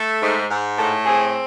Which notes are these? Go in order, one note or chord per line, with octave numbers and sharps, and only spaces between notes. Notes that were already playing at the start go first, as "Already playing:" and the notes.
Already playing: A3
G#2
G#2
A2 A4
C4 G#4